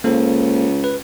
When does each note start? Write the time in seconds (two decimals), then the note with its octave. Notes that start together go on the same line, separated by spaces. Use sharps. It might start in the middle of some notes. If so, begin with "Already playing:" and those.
0.04 C#2 A#3 A4 C5
0.84 B4